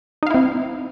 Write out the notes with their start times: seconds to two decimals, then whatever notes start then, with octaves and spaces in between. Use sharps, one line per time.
0.23 D#4
0.27 F5
0.30 E4
0.34 C4